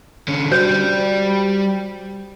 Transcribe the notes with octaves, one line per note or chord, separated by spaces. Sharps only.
D3 C#4
G3 F#4 C5 D5 G6